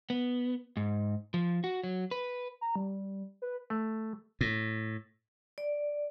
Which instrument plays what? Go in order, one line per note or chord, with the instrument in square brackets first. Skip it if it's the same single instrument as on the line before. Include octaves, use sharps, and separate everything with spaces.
[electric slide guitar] B3
G#2
F3
F#4
F#3
B4
[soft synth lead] A#5
G3
B4
[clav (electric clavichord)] A3
[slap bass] A2
[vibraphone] D5